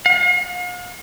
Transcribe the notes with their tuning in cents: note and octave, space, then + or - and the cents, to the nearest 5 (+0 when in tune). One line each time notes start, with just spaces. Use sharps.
F5 +45